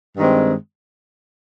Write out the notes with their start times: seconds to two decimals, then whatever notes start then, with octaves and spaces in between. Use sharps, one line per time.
0.17 G2 D#3 G#3 C4